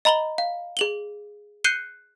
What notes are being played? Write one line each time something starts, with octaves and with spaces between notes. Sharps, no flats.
D#5 A#5 B5 F#7 G7
F5
G#4 F#7 G7
F#6 G6 C7 C#7 D#7 G7